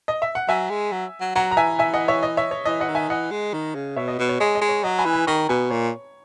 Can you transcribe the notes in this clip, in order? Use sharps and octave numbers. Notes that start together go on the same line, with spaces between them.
D#5
E5
F#5
F#3 E5 G#5
G#3
F#3
F#3
F#3 F#5 A#5
A#5
E3 E5 G#5
E5 G#5
D#5 F#5
C#5 E5
D#5
C#5 E5
C#5
E3 D#5
D#5 F#5
D#3
E5 G#5
E3 D#5 F#5
G#3
D#3
C#3
B2 C#5 E5
D#5
B2
C#5
G#3 D#5
D#5
G#3
C#5
F#3 D#5
G#5 B5
E3
G#5 B5
D#3 A#5 C#6
B2 G#5 B5
A#2 C#5